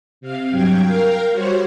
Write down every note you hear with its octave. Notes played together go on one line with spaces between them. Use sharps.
C3 F5
G2 F#3 G5 G#6
A#4 F5 G5
G3 F#4 C5 C#5